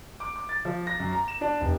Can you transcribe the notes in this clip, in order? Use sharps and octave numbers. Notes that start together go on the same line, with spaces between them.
D6
D6
A6
F3
A#6
F#2
A#5
E7
D4
F1